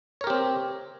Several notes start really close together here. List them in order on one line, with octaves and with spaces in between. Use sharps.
C#5 A#4 G4 C4